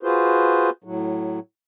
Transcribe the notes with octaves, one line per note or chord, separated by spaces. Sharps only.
F4 F#4 G#4 B4 C5
A2 F#3